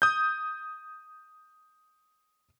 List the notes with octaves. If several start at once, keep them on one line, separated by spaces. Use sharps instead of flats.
D#6 G6